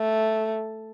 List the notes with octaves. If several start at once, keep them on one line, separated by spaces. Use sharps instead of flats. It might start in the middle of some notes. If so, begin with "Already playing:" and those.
Already playing: A3